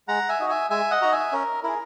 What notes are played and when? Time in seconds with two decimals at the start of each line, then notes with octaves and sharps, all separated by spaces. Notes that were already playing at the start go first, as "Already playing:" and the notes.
0.08 G#3 F#5 A#5
0.29 E5 G#5
0.40 D#4 F#4
0.50 E5 G#5
0.70 G#3 E5 G#5
0.91 D#5 F#5
1.02 D#4 F#4 A#5
1.12 E5 G#5
1.32 C#4 A#4
1.64 E4 G#4 A#4